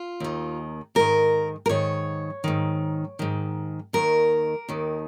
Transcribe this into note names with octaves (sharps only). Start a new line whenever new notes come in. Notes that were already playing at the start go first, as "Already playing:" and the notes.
Already playing: F4
D#2 D#3
G#2 D#3 A#4
A#4
G#2 D#3 C#5
G#2 D#3
G#2 D#3
D#2 D#3 A#4
D#2 D#3